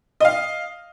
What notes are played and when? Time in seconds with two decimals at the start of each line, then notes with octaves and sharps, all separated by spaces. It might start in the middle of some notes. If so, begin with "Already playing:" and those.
0.20 D#5 F5